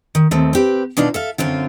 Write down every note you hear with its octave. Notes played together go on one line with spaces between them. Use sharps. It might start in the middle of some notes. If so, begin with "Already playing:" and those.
D#3
D#2 A3 C4
C4 G4 B4
B2 D4 D#4 F4
A4 E5 F5
F#2 D3 C4 F4